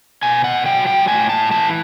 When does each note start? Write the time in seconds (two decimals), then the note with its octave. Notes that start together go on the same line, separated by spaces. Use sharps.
0.23 B2 G#5
0.44 F#5
0.66 F#3 G5
0.86 G5
1.08 A2 G#5
1.29 A5
1.51 E3 A5